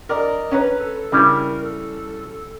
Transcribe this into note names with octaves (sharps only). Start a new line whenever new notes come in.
A#4 D5 D#5
C#4 B4 A#5
A4
C#3 G3 E4 A#4
A4